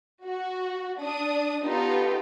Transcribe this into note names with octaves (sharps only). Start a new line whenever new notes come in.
F#4
D4 D#6
B3 D#4 F4 G4 A4